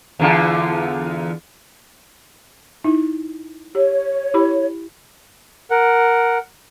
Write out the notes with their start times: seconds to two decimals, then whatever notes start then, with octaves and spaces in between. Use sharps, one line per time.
0.19 E2 D3 F4
2.84 D#4 E4
3.75 G4 C#5
4.34 E4 G4 B5
5.71 A#4 F#5